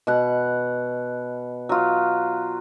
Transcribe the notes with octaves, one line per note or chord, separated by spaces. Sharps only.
B2 F#5
F#3 F4